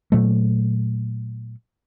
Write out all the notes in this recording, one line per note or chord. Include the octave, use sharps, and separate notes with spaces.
A#2 F#3 A3